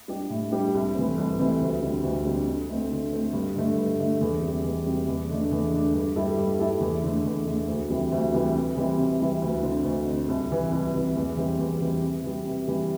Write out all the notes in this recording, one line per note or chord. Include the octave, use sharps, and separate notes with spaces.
G3 D4 G4
A2
G3 D4 G4
C2
C3 E3 A3 C4
C2
C3 E3 A3 C4
D2
D3 G3 C4
D2
D3 G3 C4
D3
A3 C4
D3
A3 C4
G2
D3 A3
G2
D3 A3
E2
C3
G3
E2
C3 G3
E2
D3 A3 D4
E2
D3 A3 D4
G2
G3 E4 A4
G2
G3 E4 A4
E2
D3 A3
E2
D3 A3
D2
C3 E3 G3
D2
C3 E3 G3
C3
E3 G3 C4 E4
C3
E3 G3 C4 E4
D2
D3 C4
D2
D3 C4
C2
C3 E3
C2
C3 E3
E2
E3 G3 C4
E2
E3 G3 C4
C3
E3 G3
C3
E3 G3